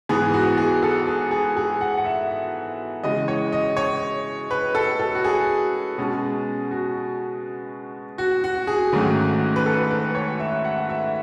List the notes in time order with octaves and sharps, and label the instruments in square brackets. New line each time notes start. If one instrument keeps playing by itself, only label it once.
[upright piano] G#2 E3 B3 G#4
F#4
G#4
A4
G#4
G#4
G#4
F#5
F#5
E5
C#3 E3 G#3 D#5
C#5
D#5
C#5
B4
A4
A4
F#4
G#4
B2 G#3 C#4
F#4
F#4
F#4
G#4
G#2 D#3 F#3 A3 C#4
B4
A4
B4
C#5
E5
F#5
E5